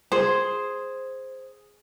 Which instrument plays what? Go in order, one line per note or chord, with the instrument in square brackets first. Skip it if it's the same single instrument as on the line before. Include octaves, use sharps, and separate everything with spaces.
[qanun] G#4 [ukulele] C5